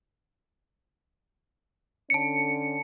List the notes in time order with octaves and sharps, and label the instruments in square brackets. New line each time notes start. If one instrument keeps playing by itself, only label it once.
[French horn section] D3 C#4 [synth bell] A5 C#7